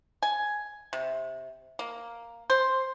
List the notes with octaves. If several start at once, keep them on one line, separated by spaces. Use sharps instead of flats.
G#5
C3
A#3
C5